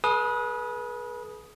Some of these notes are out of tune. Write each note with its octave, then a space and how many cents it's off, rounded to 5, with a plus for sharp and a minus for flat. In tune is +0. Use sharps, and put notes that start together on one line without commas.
G#4 +35 B4 -30 D#6 +0